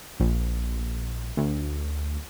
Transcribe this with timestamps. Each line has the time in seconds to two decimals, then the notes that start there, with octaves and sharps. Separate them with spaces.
0.20 A#1
1.37 D2